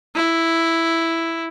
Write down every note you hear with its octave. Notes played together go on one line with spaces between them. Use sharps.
E4